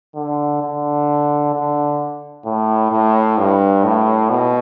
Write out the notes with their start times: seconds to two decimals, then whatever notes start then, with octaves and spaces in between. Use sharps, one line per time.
0.15 D3
0.62 D3
1.54 D3
2.46 A2
2.92 A2
3.38 G2
3.84 A2
4.30 B2